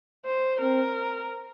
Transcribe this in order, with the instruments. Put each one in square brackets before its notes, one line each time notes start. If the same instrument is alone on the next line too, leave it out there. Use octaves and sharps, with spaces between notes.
[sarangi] C5
[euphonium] C4 [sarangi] A#4